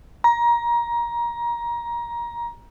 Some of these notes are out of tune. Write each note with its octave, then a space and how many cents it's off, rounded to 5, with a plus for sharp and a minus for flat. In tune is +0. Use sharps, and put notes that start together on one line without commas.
A#5 +20